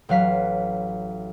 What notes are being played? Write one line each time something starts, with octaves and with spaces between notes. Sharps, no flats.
A1 F#3 F5 B6